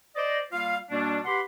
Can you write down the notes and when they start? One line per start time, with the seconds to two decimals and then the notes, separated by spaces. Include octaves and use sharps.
0.16 C5 D5 D#5
0.53 G3 A#3 F4 F5
0.90 B2 G3 A#3 D4
1.25 G4 B4 F#5 B5 C6